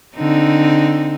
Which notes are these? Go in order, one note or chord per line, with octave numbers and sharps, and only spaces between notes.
D3 C4 D#4